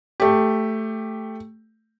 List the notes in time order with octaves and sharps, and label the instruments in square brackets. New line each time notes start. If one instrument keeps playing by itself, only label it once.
[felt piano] A3 G4